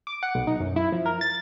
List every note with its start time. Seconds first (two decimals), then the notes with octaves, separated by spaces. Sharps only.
0.07 D6
0.23 F#5
0.35 B1
0.47 D#4
0.60 F#2
0.76 E4
0.92 F3
1.06 A#4
1.21 A6